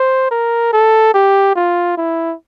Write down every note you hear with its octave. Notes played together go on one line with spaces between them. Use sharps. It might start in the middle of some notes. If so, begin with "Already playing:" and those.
Already playing: C5
A#4
A4
G4
F4
E4